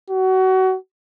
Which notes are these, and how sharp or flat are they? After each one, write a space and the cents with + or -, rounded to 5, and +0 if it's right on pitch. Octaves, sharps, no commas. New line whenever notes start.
F#4 +25